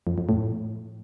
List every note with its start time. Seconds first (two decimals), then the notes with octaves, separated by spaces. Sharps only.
0.07 F2
0.18 F2
0.29 A2